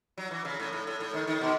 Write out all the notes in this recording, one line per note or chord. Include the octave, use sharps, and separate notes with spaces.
F#3
E3
C#3
A2
A2
A2
A2
D#3
D#3
B2